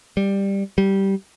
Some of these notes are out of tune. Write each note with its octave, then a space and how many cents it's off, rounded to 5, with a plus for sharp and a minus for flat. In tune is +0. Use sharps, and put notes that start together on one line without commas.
G3 +10
G3 -10